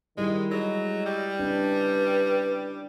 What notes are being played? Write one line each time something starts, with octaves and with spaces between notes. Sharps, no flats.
D#3 G3 G#3 E4 D#5
F#3 G#3
G3
C#4 D4 B4